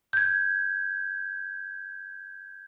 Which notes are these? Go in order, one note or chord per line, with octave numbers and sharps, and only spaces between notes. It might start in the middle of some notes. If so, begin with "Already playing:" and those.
G6 G#6